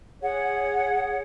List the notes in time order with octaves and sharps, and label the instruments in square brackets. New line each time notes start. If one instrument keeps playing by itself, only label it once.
[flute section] G#4 C#5 F#5